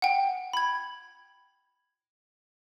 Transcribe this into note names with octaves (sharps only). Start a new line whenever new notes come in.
F#5 G5
B5 G#6